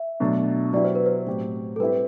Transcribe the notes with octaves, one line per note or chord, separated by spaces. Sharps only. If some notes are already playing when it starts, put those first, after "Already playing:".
Already playing: E5
B2 F#3 A3 D4 A4
F#3 B3 E4 G4 D5
C5
B4
C5
A2 F#3 C4 G4
A4
G3 C4 E4 G4 B4